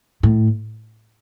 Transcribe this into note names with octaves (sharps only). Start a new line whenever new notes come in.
A2